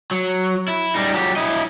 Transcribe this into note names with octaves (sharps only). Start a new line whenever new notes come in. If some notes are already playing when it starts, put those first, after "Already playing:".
F#3
E4
G3 D#4
F#3 G4
E4 D#5